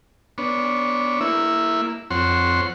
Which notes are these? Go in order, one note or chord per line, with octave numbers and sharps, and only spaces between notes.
B3 D4 C#5
A#3 E4 E5
F2 C4 C#5 F#5 C6